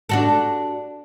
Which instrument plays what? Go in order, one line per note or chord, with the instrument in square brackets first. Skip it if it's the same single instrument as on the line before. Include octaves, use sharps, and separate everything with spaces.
[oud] D4 F#4 A4